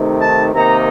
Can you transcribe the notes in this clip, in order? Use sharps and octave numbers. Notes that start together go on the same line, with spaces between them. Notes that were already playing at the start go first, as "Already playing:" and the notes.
Already playing: C3 D#3 A3 D#4
A5
C3 D#3 A#3 D#4 A#5